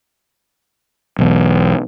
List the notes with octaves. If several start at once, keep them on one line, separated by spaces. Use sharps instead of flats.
B1 E2